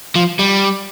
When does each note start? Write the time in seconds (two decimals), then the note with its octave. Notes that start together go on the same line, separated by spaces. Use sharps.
0.16 F3
0.39 G3